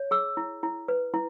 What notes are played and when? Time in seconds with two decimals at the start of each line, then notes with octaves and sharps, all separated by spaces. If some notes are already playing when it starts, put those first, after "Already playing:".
Already playing: C#5
0.11 G#4 E6
0.37 E4
0.63 E4
0.88 B4
1.14 E4